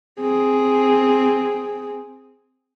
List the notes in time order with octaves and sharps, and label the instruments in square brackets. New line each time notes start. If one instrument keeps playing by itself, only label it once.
[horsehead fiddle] C4 G#4